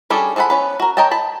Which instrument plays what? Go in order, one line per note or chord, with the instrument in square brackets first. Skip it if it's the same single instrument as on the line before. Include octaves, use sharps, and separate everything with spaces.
[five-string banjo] G3 C#4 D4 G#4 A4
F3 G#4 A4 F#5 B5
B3 C#4 B4
F#4 A#4
A#4 C#5 D#5 G5 A5
A5 B5